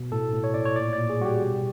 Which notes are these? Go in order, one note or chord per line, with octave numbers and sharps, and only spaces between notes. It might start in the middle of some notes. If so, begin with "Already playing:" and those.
Already playing: B2
A2 A4
A2
C#5
A2 D5
C#5
A#2 D5
A#2 D5
G#4
G3 F#4
G4
B2